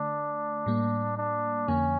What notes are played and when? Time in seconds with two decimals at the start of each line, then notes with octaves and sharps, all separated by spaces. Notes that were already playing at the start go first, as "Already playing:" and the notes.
Already playing: D3 A3 D4
0.66 A2 G3 A#3
1.17 D4
1.68 F2 D3 F3 A#3 C#4